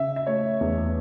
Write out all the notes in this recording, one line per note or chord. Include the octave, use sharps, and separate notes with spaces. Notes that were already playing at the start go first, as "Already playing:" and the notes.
Already playing: C#3 E5
E5
A3 C#5
E2